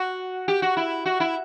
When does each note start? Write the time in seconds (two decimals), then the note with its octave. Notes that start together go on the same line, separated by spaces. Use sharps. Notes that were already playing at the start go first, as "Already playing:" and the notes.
Already playing: F#4
0.48 G4
0.62 F#4
0.77 E4
1.06 F#4
1.20 E4